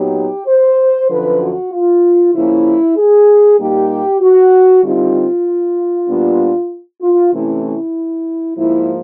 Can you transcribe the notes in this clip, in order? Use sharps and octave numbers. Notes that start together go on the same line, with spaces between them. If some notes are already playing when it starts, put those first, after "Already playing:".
Already playing: A#2 F#3 B3 D#4 G4
C5
F#2 D3 F3 B4
F#4
F4
C#3 F3 A#3 C#4 E4
G#4
A#2 G3 A#3 D#4 G4
F#4
D3 G3 C4 D#4 F4
A#2 G3 B3 D4
F4
C3 E3 A3 C#4 E4
E4
G#2 F3 A#3 E4